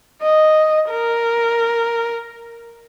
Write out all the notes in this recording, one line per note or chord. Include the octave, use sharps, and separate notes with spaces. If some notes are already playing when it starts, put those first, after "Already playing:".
D#5
A#4